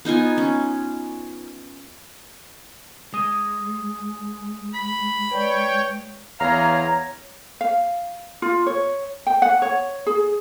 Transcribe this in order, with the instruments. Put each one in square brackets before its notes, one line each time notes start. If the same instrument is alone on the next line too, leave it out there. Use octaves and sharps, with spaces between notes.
[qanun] B3 D#4 F4 G#5
C#4
[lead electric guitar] G#3 [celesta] D#6 D#7
[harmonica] B5 [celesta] B6
[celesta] B4 D5 [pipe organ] C#5 G5
[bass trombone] E2 [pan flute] C#5 [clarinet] F5 [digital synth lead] A#5
[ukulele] F5
F4
C#5
G5
F#5
C#5
G#4